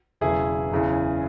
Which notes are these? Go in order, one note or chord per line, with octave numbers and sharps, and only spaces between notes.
E1 E2 C#3 F#3 E4 G#4
F#1 E2 C#3 E3